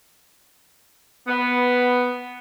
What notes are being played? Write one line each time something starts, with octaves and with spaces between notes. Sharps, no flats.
B3